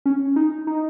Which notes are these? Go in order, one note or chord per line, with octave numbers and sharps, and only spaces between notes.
C#4
D#4
D#4